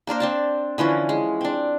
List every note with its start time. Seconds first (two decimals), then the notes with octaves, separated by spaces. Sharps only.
0.07 A#3 D4 A#4 C5
0.20 C4 D4 A5
0.78 D3 E3 F3 C#4
1.09 G#3
1.41 C4 D4